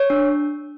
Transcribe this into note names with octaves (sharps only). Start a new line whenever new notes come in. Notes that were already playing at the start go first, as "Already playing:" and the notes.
Already playing: C#5
D4